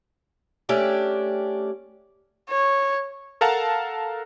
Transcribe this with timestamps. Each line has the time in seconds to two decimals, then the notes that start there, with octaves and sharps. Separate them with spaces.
0.69 A3 C#4 D4 G4
2.50 C#5
3.41 A4 A#4 F5 F#5 A5 A#5